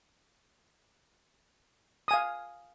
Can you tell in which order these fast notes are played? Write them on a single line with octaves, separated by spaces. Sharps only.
D#6 G#5 F5